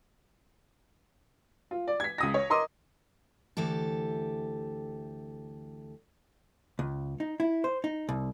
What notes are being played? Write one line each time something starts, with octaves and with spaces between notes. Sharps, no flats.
F4
D5
G#6 B6
C#2 D#6 A#6
C#5
A#4 D#5 C6 D6 D#6
D2 E3 G4 A4
C#2
D#4
E4
C5
D#4
C2